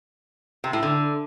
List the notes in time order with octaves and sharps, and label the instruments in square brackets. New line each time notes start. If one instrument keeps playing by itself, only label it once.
[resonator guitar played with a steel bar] C3
A2
D3